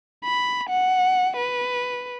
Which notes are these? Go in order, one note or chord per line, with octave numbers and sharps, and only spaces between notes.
B5
F#5
B4